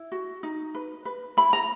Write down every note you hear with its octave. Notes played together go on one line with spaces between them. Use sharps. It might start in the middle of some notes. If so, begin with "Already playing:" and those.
Already playing: E4
F#4
D#4
B4
B4
E4 B5
A#5